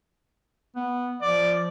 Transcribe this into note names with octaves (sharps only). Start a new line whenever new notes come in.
B3
F3 D5